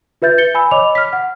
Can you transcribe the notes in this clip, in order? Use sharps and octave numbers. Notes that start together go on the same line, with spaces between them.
F4 B4 E5 G6 A6
A6 C#7 G7
G#5 B5 E6
C#5 D#5 B5 D6 F7
F6 B6
F#5